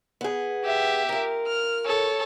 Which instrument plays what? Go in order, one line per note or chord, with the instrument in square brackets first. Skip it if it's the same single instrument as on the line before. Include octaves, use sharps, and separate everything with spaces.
[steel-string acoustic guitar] B3 G#4
[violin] G4 E5
[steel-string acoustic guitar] F4 A#4
[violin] F6
A4 C#5